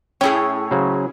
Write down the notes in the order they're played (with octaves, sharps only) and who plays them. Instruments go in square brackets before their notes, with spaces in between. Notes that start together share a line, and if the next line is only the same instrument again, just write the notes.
[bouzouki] A2 C#5 [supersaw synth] C#4 E4 G#4 [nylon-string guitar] G5
[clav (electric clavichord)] C#3 F#3 C5